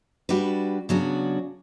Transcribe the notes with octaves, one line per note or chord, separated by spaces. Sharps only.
G3 D4 F#4 B4
C#3 F#3 B3 D4 F#4